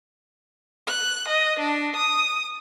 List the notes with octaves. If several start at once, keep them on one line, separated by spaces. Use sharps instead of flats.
F#6
D#5
D4
D#6